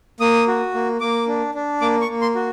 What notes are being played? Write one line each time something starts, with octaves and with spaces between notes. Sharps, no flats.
A#3 D#6
F#4
A#3
A#3 D6
D4
D4
A#3 D6
C#6
A#3
C6
F#4